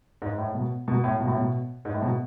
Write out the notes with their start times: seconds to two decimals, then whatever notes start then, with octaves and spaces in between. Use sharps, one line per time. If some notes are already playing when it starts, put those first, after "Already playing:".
0.22 G#2
0.38 A2
0.54 B2
0.88 B2
1.04 A2
1.20 B2
1.28 A2
1.36 B2
1.85 G#2
1.94 A2
2.02 B2